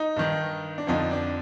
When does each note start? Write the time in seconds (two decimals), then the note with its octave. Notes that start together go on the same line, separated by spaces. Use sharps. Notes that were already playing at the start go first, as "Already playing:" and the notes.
Already playing: D#4
0.16 G2 D#3
0.78 D4
0.87 F2 D3 F3 D#4
1.11 D4